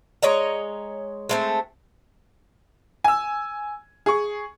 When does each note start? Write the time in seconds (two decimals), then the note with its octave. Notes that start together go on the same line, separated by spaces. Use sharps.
0.23 G#3 C#5 D#5 A#5
1.29 G#3 A3 C4
3.04 G#5 E6
4.06 G#4 C#6